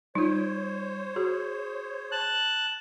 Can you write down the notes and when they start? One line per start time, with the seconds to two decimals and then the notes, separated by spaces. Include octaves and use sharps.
0.15 G3 D#4 F4 C5 C#5
1.16 F#4 G#4
2.12 A5 F#6